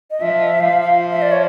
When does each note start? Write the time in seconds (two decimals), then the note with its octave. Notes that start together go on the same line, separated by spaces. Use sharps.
0.11 D#5
0.21 F3 E5
0.60 F3 F5
0.82 F5
1.11 E5
1.22 D5
1.32 C#5